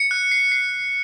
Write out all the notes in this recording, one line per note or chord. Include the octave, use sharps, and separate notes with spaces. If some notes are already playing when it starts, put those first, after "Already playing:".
Already playing: C#7
F#6
C7
C7